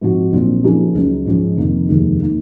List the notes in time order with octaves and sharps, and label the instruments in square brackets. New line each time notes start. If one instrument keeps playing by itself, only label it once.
[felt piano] G#2 F3 C4 F#4
A#1 A#2 F#3 C4
C#3 F3 A#3 D#4 G#4
C#2 C#3 F#3
G#2 F3 G#3 C#4
F1 F2 D#3 A#3
F1 D#2 D#3 G#3 D#4
D#3 A#3 D#4